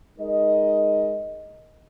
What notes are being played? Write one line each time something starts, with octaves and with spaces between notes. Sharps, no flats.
G#3 D#4 A#4 D#5